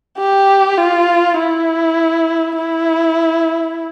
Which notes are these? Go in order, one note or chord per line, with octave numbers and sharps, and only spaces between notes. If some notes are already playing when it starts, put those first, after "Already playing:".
G4
F4
E4
E4